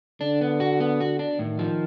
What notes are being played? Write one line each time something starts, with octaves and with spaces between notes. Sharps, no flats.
D3 D4
B3
F#4
B3
F#4
D4
A2 D#3
F3